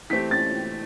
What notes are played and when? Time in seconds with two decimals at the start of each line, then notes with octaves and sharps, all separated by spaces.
0.10 E3 A3 C4 G4 B6
0.31 A6